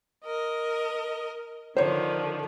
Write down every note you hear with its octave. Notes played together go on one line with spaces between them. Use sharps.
A#4 D#5
D3 D#3 F3 C5 C#5